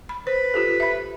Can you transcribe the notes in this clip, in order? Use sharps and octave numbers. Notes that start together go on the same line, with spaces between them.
B5
B4 C5
F4 G4 A4
E5 B5